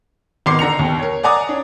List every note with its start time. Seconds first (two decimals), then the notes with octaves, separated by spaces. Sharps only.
0.46 G#1 D#3 B3 C6 D6 C7
0.59 D3 A#5 C#7 F7
0.79 D#2 B2
0.99 A#4 C#5
1.23 D5 F#5 G#5 A#5 D6 D#6
1.48 C#4 D4